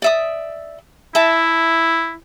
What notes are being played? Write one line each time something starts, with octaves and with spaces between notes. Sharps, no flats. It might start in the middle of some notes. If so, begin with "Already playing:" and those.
D5 E5 D#6
E4 E5 A5